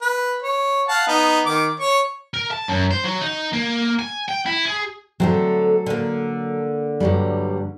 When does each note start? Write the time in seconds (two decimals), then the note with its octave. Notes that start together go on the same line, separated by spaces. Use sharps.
0.02 B4
0.42 C#5
0.88 F5 F#5 A5
1.07 B3 D#4
1.46 D#3 D6
1.80 C#5 C#6
2.34 A#4
2.51 A5
2.68 F#2
2.91 C5
3.04 F#3
3.21 D#4
3.53 A#3
3.99 G#5
4.28 G5
4.46 E4
4.65 G#4
5.20 D3 F#3 A3 C4 A4
5.86 D3 A#3
7.00 G2 F#3 G3